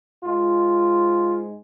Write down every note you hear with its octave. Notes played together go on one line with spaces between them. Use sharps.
G#2 G#3 F4